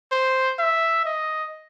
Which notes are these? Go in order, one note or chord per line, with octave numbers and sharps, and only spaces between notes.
C5
E5
D#5